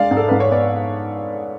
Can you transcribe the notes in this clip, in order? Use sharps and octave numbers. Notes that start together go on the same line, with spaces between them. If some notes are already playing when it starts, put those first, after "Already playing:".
Already playing: G#3 D4 D5 F5
G#2
A4
G#2 B4
C#5
B3 D5